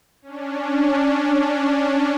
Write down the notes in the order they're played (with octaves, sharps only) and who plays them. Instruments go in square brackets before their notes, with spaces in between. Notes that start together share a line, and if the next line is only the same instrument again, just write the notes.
[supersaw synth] C#4 D4